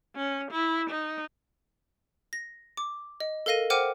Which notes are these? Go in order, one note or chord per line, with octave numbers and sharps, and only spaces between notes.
C#4
E4
D#4
A#6
D6
D#5
A4 A#4 F5 A#6 D#7
C5 F#5 G5 D6 F6 D#7